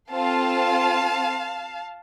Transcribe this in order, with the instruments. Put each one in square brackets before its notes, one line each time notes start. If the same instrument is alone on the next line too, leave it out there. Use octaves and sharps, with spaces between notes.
[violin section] C4 F4 A4 F5 A5